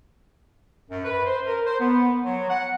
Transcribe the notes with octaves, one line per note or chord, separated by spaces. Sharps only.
F#2
B4
C5
A#4
C5
B3
F#3
F#5